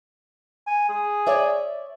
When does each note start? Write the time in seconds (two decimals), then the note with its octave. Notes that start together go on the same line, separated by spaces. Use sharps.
0.67 G#5
0.89 G#4
1.26 C#5 D5 E5